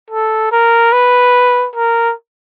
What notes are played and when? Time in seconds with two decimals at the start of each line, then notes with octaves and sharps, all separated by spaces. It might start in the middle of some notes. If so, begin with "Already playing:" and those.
0.10 A4
0.52 A#4
0.93 B4
1.76 A#4